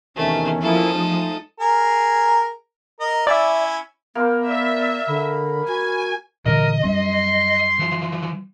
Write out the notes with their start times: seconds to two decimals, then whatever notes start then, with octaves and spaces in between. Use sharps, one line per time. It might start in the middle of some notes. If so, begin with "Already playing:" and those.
0.16 E2 C3 D#3 A3 C#4
0.62 F3 A#3 E4 A4 D#6
0.92 G#3 A3 D#4
1.60 G#4 A#4
3.00 A#4 D#5
3.27 C#4 E4 D5 E5
4.15 A#3 B3 A#4 C5
4.48 D5 E5
5.07 D3 B5
5.67 F#4 G#5
6.46 A#2 D3 E3 A#4 D#5
6.84 F#2 G3 C#4 C6
7.79 E3 F3